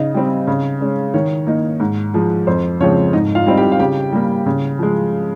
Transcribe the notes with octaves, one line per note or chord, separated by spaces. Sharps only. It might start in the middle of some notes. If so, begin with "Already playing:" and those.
Already playing: C#3 D#4 D#5
G3 C4
C#3
G#3 C#4
D#3 C#5
A#3 D#4
G#2
F3 G#3
F2 C5
C#3 F3 G#3 C4 C#5
G#2 D#4 D#5
F4 F5
G3 C4 D#4
G4 G5
F5
C#3 G4 G5
G3 A#3
C#3
F3 G#3